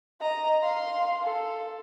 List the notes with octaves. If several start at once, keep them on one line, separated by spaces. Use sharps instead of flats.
D#5 A#5
F5 C6
A4